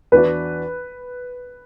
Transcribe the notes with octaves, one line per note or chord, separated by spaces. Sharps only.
E2 E3 B3 D4 F#4 B4